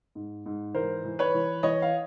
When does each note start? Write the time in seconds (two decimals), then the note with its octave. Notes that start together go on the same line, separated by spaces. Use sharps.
0.15 G#2
0.46 G#2
0.75 E3 A#4 C5
1.05 E3
1.19 B4 C#5
1.34 E3
1.63 E3 C#5 D#5
1.82 F5